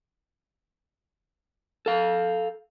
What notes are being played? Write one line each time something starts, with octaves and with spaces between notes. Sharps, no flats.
A4 F5